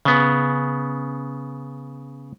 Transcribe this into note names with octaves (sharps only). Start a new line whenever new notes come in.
C#3 B3